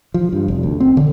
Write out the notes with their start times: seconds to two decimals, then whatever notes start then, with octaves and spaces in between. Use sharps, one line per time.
0.14 F3
0.33 G2
0.48 F1
0.63 D2
0.80 C4
0.97 D3